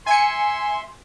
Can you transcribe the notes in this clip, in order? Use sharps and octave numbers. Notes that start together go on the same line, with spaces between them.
E5 G#5 C6 C#7